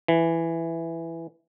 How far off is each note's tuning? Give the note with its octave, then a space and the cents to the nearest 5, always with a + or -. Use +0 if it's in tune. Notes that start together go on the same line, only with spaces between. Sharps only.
E3 +5